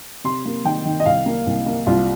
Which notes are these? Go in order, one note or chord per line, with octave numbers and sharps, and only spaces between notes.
C3 C6
A#3
D#3 G5
D#3
D#5
C2 F5
A#3
C2
A#3
C2 F4